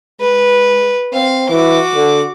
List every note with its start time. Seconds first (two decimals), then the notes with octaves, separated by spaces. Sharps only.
0.20 G#3 B4
1.13 C4 F5
1.49 E3 F#4 D6
1.95 D3